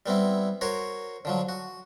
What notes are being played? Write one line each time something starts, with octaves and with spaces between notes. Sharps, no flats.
G3 B3 C4 E4
F#4 A#4 C5 C#5
D3 F3 F#3
F#4